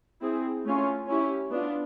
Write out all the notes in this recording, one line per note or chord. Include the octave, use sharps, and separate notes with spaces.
C4 E4 G#4
A3 C#4 F4
C#4 E4 G4
B3 D4 F4